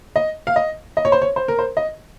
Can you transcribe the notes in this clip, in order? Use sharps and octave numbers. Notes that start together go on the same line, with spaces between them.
D#5
F5
D#5
D#5
C#5
C5
C#5
C5
A#4
C5
D#5